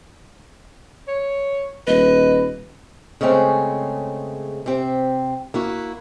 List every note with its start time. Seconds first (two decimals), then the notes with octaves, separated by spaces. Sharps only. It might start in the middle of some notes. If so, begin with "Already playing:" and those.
1.08 C#5
1.87 D#1 B4 D#5
3.21 C#3 G#3 A3 C4 C#4
4.66 C3 C4
5.54 A#3 E4 F#4